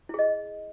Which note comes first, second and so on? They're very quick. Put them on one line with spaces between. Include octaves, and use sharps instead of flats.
E4 G#4 D#5